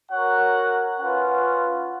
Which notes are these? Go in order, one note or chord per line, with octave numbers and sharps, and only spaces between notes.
F#4 A#4 C#5 F#5
C#4 F4 B4 F#5